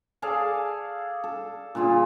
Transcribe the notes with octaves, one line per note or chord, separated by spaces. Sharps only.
G#4 A4 D5 F5
A4
A#2 D3 F4 G#4